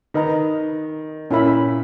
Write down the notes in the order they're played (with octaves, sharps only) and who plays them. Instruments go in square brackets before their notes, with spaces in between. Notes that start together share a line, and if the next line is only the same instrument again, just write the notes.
[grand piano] D#3 [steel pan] B4 D#5 A#5
[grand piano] A#2 [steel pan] C#4 E4 A#4 E5 B5